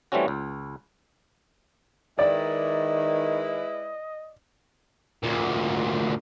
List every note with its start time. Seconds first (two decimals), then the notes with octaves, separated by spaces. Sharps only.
0.12 E3 G3 A3 C4 C#4 F#4
0.28 C#2
2.19 D#3 G#3 E4 B4 D5 D#5
5.23 D2 A#2